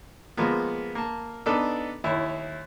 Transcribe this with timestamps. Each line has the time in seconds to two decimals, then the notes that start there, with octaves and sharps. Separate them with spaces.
0.37 F3 G#3 A#3 B3
0.95 A#3 A5
1.46 B3 D4 D#4 A4
2.04 D#2 E4 C#5